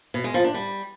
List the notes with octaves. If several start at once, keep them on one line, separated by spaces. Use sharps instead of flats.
B2
G#3
F3
D4
G3